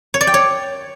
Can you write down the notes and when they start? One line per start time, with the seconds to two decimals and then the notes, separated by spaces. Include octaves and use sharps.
0.14 C#5
0.21 D5
0.27 G5
0.34 C#5